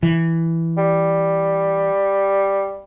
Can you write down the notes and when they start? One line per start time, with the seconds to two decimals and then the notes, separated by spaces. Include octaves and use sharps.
0.03 E3
0.77 G3